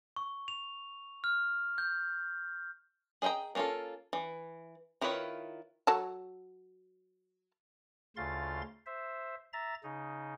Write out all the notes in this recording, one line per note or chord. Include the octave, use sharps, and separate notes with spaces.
C#6
F7
F6
G6
G#4 D#5 E5 G5 A#5
A#3 C#4 D4 F4 A4
E3
D#3 E4 F4 B4 C#5
F#3 A4 A5
D2 C#3 F4 F5 C6 A6
C5 E5
E5 A#5 A6
C#3 D#4